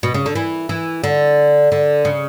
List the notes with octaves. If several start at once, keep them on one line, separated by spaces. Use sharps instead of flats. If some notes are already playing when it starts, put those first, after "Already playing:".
B2
C#3
D3
E3
E3
D3
D3
C#3